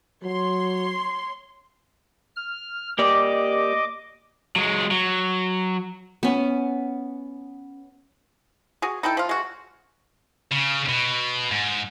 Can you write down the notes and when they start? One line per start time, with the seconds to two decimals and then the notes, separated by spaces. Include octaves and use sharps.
0.24 F#3 C#5 C6
2.36 F6
2.99 A#3 G4 D5 D#5 D6
4.56 F#3 G#3
4.91 F#3
6.23 B3 C#4
8.82 F#4 G#4
9.03 D#4 E4 A4 G5
9.17 F3 F4
9.29 G#3 F#4
10.52 C#3
10.89 B2
11.52 G#2